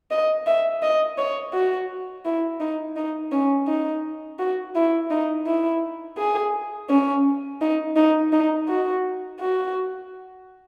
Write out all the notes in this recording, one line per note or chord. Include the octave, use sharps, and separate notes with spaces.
D#5
E5
D#5
C#5
F#4
E4
D#4
D#4
C#4
D#4
F#4
E4
D#4
E4
G#4
C#4
D#4
D#4
D#4
F#4
F#4